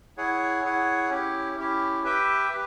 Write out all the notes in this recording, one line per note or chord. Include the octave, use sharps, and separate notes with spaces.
E4 G#4 C#5 F#5
E4 G#4 C#5 F#5
C#4 E4 G4
C#4 E4 G4
G4 B4 E5 G5
G4 B4